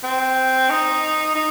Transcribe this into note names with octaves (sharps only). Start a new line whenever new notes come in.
C4
D#4
D#4